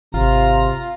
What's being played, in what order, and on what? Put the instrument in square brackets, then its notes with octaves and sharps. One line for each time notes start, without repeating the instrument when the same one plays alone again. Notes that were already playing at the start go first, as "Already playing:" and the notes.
[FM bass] G#1 [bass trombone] C3 [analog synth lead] F4 [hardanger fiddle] A#5